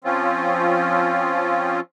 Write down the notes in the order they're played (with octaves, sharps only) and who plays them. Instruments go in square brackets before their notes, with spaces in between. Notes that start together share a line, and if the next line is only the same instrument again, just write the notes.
[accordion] F3 C4 C#4 F4